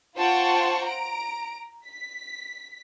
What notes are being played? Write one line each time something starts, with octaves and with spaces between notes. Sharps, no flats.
F4 C5 F#5 G5 A5 C#6
A#5 D7
B6